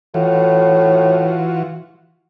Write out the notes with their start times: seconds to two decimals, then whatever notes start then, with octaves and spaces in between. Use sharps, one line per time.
0.14 A2 E3 F4 F#4